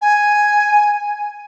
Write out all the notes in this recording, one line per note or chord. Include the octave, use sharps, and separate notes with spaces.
G#5